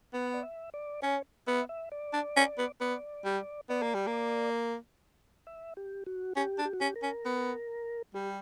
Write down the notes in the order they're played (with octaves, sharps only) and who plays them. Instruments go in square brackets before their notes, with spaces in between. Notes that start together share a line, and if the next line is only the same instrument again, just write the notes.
[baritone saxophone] B3 [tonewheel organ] F#5
[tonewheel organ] D5
E5
D5
[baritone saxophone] C#4 [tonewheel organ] C#5
[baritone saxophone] B3 [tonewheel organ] E5
[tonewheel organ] E5
D5
[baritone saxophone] D4
C#4
B3
[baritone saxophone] B3 [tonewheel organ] D5
[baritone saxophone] G3
[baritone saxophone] B3 [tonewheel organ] D5
[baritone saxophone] A#3
G3
A#3
[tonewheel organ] E5
G4
F#4
[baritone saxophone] C#4 [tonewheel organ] G4
[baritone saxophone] D4
[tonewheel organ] G4
F#4
[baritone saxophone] C#4 [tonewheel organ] G4
[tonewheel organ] A#4
[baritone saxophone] C#4
B3
[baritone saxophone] G3 [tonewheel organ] G4